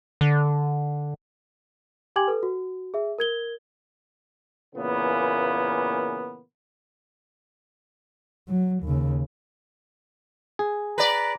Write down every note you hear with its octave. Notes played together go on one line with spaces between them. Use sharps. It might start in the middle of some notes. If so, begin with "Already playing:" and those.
D3
G4 G5 G#5 D6 G#6 F#7
A4 B4
F#4
G#4 E5
A#4 G#6 G7
A#2 C#3 E3 A#3 B3
F#3
D#2 C#3
G#4
B4 D5 A#5